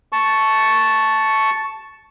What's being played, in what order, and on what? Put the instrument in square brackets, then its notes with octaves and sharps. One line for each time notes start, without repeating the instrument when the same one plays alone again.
[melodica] A5 C#6